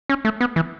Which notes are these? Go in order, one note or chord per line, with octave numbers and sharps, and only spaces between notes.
C#4
A3
B3
E3